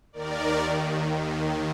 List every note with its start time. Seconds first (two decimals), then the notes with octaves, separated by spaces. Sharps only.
0.13 D#2 D#3 A#4 D5
0.60 D#2 D#3
1.06 D#2 D#3